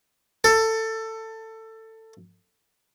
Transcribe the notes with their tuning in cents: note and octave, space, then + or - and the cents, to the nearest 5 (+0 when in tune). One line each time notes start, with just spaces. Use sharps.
A4 +20